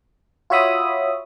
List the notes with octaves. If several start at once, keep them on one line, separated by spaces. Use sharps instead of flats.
F4 F#4 C#5 E5 B5 D#6